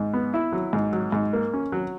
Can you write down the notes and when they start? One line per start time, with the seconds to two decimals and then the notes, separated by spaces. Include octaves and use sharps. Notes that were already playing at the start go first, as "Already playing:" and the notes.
Already playing: G#2
0.13 B3
0.34 E4
0.52 F#3
0.73 G#2
0.93 F#3
1.12 G#2
1.33 A#3
1.54 C#4
1.72 F#3